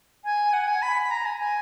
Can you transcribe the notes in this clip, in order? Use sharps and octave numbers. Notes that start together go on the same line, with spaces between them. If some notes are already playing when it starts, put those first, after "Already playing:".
G#5
F#5
G#5
B5
B5
A#5
G#5
G#5